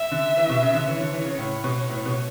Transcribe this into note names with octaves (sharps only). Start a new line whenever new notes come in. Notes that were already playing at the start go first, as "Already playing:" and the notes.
Already playing: E5
D3
E3
B2
C#3
D3
E3 C#5
D3
E3
C#3
A2 C#5
B2
A2
B2